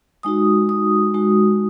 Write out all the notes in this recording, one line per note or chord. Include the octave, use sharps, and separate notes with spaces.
G#3 D#4 F#4 D#6
D#6
G#3 D#4 F#4